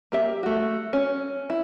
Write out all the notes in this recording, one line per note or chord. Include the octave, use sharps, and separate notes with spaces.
A#3 G4 E5
A3 F#4
C#4
E4